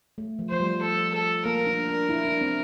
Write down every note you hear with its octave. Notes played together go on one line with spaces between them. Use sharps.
A3
F3
F3 C5
G3
A4
A4
A#3 A#4
D4
D4
E4
D4
C4